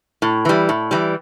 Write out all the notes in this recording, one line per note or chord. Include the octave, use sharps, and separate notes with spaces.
A2
E3 G3
A2
E3 G3